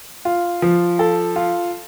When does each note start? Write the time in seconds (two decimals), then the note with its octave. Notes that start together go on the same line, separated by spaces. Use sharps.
0.25 F4
0.62 F3
0.99 A4
1.36 F4